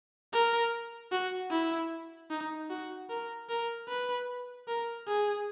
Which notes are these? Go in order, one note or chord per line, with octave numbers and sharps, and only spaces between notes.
A#4
F#4
E4
D#4
F#4
A#4
A#4
B4
A#4
G#4